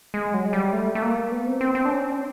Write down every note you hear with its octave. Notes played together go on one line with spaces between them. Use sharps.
G#3
F#3
G#3
G3
A3
A3
A#3
B3
C4
C4
C4
D4
C#4